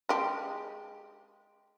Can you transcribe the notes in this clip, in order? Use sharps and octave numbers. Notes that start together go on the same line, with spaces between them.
G#3 G4